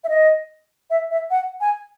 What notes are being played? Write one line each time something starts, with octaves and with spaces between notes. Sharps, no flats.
E5
D#5
E5
E5
F#5
G#5